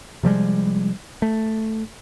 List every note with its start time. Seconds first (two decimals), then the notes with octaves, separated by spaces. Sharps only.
0.23 C3 F3 G3 G#3
1.22 A3